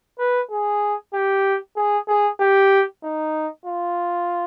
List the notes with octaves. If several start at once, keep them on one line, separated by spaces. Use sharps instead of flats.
B4
G#4
G4
G#4
G#4
G4
D#4
F4